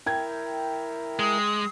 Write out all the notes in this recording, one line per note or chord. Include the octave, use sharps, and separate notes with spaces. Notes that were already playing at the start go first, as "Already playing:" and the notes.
E4 A#4 G5 G#6
G#3 D#6